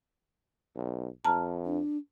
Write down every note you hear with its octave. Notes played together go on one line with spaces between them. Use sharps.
B1
F2 A5 A#5 F6
D4